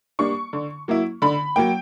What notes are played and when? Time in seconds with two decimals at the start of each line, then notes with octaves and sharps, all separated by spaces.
0.19 G3 A#3 D4 C#6
0.53 D3
0.88 F#3 A#3 E4
1.22 D3 B5
1.56 F#3 A#3 G5